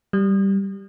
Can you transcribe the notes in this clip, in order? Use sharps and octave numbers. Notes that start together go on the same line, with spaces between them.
G3